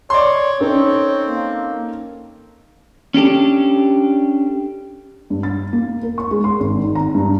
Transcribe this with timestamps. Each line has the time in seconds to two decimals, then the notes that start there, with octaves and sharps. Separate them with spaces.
0.10 C#5 D5 C6
0.60 C4 C#4 D#4 A4 C#5
1.28 A#3
3.14 C#4 D4 G4 A4
5.30 G2
5.43 A6
5.73 A#3
6.03 A#4
6.18 C#6
6.31 G#3
6.44 C6
6.60 G#1
6.84 D#3
6.95 A#5
7.15 G2